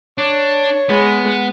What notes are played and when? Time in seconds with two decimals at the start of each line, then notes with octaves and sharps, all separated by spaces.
0.18 D4 C#5
0.89 G#3 B3